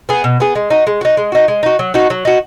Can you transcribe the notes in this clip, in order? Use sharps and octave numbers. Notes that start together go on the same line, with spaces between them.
B3 G#4
B2
B3 G#4
G#3
D#4 F#4
G#3
D#4 F#4
G#3
D#4 F#4
G#3
D#4 F#4
F#3
D#4 F#4
F#3
D#4 F#4